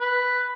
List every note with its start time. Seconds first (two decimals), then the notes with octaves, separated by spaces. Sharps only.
0.01 B4